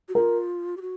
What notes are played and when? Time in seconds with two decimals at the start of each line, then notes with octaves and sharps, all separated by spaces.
0.09 F#4
0.15 F4 A#4
0.77 G4
0.82 F#4